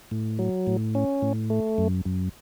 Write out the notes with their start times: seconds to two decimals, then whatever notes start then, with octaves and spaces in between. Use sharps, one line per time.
0.11 A2
0.39 F#3
0.67 A2
0.95 C#4
1.22 A2
1.50 A3
1.78 F#2
2.05 F#2